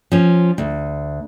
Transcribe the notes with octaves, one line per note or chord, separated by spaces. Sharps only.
F3 C#4
D2